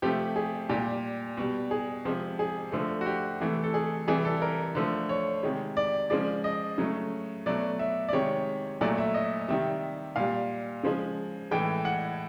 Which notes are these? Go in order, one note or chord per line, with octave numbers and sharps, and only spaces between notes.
C3 F3 A3 G4
G#4
A#2 G3 G4
B2 G3
G#4
C3 F3 G#3
G#4
D3 F3 A3
F#4
G4
C3 E3 A3
A4
G#4
C3 E3 G3 G#4
A4
A#4
D3 F3 A3
C#5
C3 D#3 G#3
D5
C#3 F3 G#3 D5
D#5
C#3 F#3 A3
B2 F#3 A3 D5
E5
D5
C3 D#3 G#3 C#5
A#2 F#3 A3 D5
E5
D#5
C3 D#3 G3 E5
A#2 G3 F5
C#3 F3 G#3
A2 E3 G#3 G5
F#5